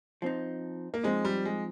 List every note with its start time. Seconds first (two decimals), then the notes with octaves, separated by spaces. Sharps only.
0.22 F3 C4 D#4
0.94 A#3
1.04 F3 G#3 C4 D#4
1.25 G3
1.45 G#3